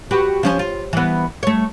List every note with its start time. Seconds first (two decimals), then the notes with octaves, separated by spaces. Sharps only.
0.11 F#4 G4 B4
0.43 F3 C#4 C5
0.59 F4
0.93 E3 B3
1.43 A3 C#5